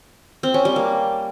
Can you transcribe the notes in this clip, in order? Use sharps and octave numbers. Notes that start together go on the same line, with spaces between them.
C4
C#4
G3
A#3